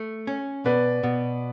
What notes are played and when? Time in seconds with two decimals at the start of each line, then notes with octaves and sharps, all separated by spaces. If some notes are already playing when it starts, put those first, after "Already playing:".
Already playing: A3
0.27 C#4
0.66 B2 B4 D5
1.03 B2